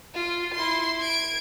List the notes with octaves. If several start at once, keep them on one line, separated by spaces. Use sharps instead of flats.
F4
E4 C6
G#6 D7